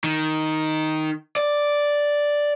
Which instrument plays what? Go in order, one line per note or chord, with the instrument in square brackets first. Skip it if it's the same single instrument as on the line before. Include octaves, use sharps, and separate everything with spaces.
[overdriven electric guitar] D#3
D5